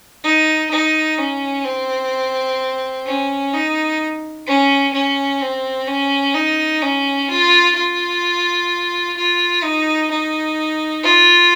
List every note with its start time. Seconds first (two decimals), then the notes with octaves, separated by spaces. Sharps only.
0.24 D#4
0.71 D#4
1.18 C#4
1.64 C4
3.06 C#4
3.53 D#4
4.47 C#4
4.93 C#4
5.41 C4
5.87 C#4
6.34 D#4
6.82 C#4
7.29 F4
7.76 F4
9.17 F4
9.63 D#4
10.11 D#4
11.04 F4